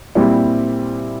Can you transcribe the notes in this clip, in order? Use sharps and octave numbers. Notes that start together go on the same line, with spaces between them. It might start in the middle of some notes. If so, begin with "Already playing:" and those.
A#2 G3 C4 E4